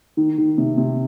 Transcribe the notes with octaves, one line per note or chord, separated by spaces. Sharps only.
D#3
D#3
C3
C3